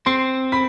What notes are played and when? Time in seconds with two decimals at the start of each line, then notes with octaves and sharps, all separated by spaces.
0.06 C4 C6 C7
0.52 B5 B6